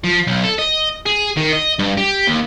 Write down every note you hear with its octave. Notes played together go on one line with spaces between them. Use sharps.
F3
B1
A4
D#5
G#4
D#3
D#5
G2
G4
D#2